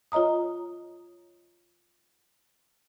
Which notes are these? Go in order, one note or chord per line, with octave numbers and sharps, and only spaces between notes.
F4 C#5 D#5 A#5 D#6